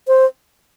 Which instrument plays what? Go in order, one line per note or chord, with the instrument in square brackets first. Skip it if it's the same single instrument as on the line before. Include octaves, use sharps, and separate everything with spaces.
[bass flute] C5